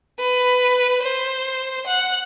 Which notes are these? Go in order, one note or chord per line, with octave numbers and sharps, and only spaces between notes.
B4
C5
F#5